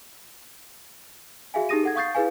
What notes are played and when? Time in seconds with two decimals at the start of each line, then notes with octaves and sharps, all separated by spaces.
1.54 F#4 G#4 E5 F5 G#5
1.69 D#4 G4 G#4 D#6 A#6 D#7
1.83 A4 F#5 G#6
1.96 F5 C#6 D#6 G6 A6 C7
2.14 E4 G#4 B4 F5 G#5